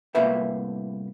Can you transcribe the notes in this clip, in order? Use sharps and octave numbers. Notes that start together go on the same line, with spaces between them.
C2 A2 A#3 B3 C5 E5